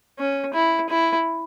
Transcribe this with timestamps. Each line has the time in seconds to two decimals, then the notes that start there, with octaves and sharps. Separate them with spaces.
0.19 C#4
0.54 E4
0.90 E4